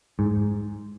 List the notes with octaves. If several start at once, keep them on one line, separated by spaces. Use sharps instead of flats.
G#2